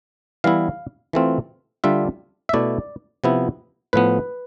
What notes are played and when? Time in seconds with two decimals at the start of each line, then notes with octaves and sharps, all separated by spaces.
0.44 E3 G3 B3 E4 F5
1.13 E3 A3 C4 F4
1.84 D3 G3 D4 F4 E5
2.49 E5
2.53 B2 A3 E4 D5
3.24 C3 F3 B3 E4
3.93 A2 F3 B3 B4